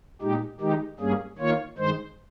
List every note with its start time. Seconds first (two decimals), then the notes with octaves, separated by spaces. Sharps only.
0.22 A#2 G#3 D#4 G4
0.60 D#3 G#3 D#4 G4
1.00 G2 G3 A#3 C#4 G#4
1.38 D#3 A#3 F4 C#5
1.78 G2 D#3 G#3 C5